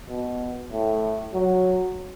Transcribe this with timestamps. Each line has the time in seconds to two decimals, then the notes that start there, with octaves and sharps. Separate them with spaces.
0.09 B2
0.72 A2
1.33 F#3